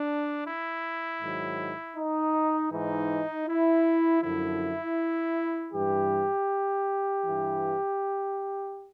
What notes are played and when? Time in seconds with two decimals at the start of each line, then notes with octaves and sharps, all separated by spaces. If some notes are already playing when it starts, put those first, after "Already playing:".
Already playing: D4
0.46 E4
1.21 G#2 D#3 F#3
1.97 D#4
2.72 G#2 E3 D#4
3.48 E4
4.23 F#2 D3 F3 E4
5.73 G2 E3 G4
7.24 G2 E3